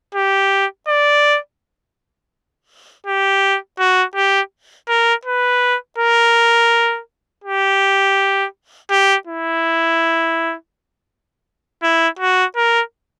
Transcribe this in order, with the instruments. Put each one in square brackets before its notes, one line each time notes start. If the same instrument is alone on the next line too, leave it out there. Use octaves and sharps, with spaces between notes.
[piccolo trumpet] G4
D5
G4
F#4
G4
A#4
B4
A#4
G4
G4
E4
E4
F#4
A#4